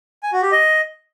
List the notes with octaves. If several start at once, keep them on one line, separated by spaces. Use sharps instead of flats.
G#5
F#4
G4
D#5